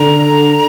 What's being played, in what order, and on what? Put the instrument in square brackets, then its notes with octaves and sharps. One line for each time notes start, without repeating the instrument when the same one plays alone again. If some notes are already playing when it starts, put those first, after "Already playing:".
Already playing: [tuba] D3 [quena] A#5